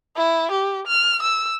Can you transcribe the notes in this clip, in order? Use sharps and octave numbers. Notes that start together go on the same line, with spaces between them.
E4
G4
F6
E6